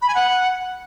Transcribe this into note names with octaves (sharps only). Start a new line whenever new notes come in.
B5
G#5
F#5